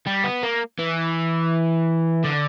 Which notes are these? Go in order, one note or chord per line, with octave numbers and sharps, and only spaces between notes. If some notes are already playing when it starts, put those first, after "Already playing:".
G3
B3
A#3
E3
D3